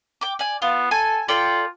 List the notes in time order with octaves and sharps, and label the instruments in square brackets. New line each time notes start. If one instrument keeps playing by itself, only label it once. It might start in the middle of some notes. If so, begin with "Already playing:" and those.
[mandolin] G5 D6
D5 G#5
[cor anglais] B3 [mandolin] F4
[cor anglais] A4 [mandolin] G#5
[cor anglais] F4 [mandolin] A4 D5 G5